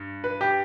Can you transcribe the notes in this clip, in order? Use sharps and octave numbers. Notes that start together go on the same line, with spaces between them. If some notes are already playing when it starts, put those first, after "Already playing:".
Already playing: G2
B4
G4